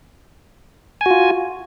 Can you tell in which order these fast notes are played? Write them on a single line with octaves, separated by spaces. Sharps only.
G#5 F#4 F4